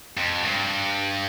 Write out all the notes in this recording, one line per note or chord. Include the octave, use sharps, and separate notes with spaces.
F2
G2